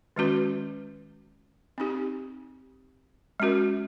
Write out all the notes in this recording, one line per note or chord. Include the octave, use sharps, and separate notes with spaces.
D#3 G#3 C#4 F#4 B4
C4 D#4 G4
G#3 C#4 F#4 A#4